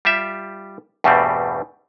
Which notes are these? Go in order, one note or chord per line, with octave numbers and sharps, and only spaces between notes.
G3 F4 G4 E5
E2 G2 B2 G3 A3 C4